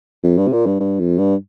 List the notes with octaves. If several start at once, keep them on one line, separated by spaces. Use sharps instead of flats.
F2
G2
C3
A#2
G2
G2
F2
G2